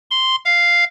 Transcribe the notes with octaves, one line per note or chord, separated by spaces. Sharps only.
C6
F5